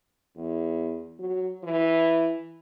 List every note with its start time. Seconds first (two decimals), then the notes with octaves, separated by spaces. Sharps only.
0.36 E2
1.19 F#3
1.63 E3